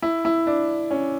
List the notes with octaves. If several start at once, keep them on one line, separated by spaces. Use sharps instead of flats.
E4
E4
D4
C#4